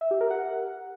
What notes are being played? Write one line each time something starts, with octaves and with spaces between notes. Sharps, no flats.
E5
G4
A#4
F#5